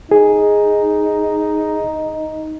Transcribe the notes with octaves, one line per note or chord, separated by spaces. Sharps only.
D#4 G#4